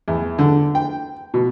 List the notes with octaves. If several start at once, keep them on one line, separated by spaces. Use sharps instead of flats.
E2
D3
G5
B2